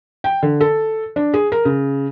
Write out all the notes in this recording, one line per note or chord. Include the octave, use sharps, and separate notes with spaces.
G5
D3
A4
D4
G#4
A#4
C#3